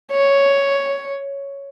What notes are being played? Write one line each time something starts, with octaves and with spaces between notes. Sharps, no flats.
C#5